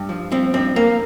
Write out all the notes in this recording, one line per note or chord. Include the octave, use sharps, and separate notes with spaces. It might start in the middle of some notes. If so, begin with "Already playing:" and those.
Already playing: G2
F3
F3 C4
G2 C4
G2 A#3